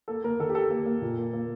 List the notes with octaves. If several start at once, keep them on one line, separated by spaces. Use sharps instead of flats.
A#3 A4
A#3 A#4
D#3 A4
G4
A#3 A4
A#3
A#3
A#2
A#3
A#3